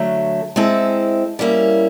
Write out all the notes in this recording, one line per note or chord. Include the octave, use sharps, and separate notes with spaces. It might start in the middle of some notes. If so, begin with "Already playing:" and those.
Already playing: D3 F#3 A3
G#3 C4 E4 A4
G3 A#3 C#4 E4